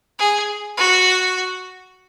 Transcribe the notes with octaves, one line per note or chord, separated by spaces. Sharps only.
G#4
F#4